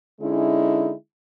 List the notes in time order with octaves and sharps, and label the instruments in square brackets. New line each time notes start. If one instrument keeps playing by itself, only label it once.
[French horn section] D3 G#3 C#4 D#4 E4